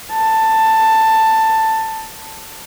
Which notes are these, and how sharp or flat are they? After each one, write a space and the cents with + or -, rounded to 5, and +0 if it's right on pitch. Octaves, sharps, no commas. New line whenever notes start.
A5 +10